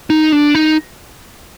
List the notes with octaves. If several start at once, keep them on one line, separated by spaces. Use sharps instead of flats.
D#4
D4
D#4